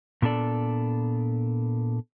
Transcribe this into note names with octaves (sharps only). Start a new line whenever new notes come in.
A#2 B3 D4 A4 D5